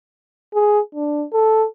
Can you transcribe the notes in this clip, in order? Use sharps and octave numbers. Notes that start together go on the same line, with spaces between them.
G#4
D4
A4